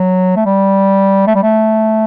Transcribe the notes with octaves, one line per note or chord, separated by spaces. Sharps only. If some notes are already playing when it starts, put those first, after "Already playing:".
Already playing: F#3
A3
G3
A3
G3
A3